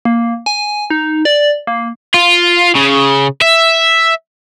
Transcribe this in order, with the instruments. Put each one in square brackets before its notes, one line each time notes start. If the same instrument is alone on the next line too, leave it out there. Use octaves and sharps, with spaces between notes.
[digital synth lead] A#3
G#5
D#4
D5
A#3
[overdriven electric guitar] F4
C#3
E5